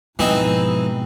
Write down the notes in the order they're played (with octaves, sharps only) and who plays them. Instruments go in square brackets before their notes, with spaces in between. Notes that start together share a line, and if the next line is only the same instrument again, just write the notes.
[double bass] G#2 B2 [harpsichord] E3 C4 D#4 [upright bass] F3